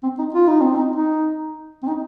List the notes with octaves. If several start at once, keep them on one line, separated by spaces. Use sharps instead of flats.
C4
D#4
F4
D#4
C4
D#4
D#4
C4
D#4